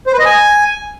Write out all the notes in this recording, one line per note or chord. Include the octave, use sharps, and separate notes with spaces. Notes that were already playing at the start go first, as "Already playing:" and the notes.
C5
B4
D#5
G#5